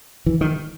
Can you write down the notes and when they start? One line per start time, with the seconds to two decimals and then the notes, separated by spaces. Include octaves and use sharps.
0.26 E3
0.41 D#3